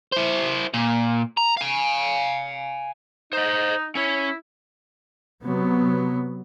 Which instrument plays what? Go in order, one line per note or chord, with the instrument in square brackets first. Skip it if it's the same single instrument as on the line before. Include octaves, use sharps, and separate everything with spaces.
[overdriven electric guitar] E4 C5
A#2
A#5
F5 G#5
[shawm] D#4 [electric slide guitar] C5 D#5
[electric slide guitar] C#4 C#5 [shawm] E4
[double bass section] C3 F#3 B3